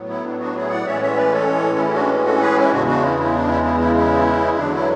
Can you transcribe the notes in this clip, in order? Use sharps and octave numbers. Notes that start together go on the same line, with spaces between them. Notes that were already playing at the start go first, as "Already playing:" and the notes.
Already playing: A2 F#3 B3
E4
D4
D4 F#4
E4 G#4
D5 F#5
A2 E3 G#3 C#4 C#5 E5
D5
C#5 E5
B4 D5
A4 C#5
E4
D4 F#4
F#4 A4
G#4 B4
E4
E2 C#3 G#3 D4 F#4
D4 F#4
E4
E4
D4
E4
E4
E4
E4
E2 D3 F#3 D4
E4